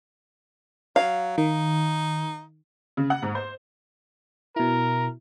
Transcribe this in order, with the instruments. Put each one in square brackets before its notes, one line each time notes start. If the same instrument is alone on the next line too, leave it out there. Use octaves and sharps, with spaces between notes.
[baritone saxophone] F#3 [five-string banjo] F5
[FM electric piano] D#3 [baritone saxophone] D#4
[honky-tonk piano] C#3
F#5
G#2
C5
[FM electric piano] B2 E4 [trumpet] A#4